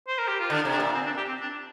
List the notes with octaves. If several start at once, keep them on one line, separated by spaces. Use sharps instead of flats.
C5
A#4
G4
F4
D3 D4
C3
D4
A#2
C4
D4
G4
C4
D4